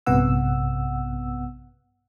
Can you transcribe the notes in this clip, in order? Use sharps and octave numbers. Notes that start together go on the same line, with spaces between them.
A#1 G2 C3 B3 F#5 E6